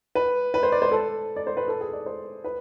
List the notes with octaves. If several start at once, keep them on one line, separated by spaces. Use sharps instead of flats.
B4
B4
C5
D5
C5
A4
D5
C5
B4
A4
G#4
D5
C5
B4